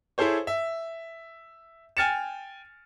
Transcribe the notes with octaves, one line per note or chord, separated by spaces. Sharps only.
E4 G#4 A4 C5 C#5
E5
G5 G#5 F6 A6 C#7 E7